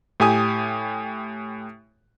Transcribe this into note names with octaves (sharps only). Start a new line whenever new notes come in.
A2 G4 G#5 D#6